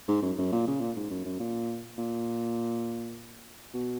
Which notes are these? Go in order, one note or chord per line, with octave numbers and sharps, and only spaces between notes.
G#2
F#2
F#2
A#2
C#3
A#2
G#2
F#2
F#2
A#2
A#2
B2